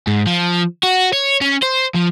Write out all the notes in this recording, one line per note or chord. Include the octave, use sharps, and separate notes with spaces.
G#2
F3
F#4
C#5
C#4
C5
F3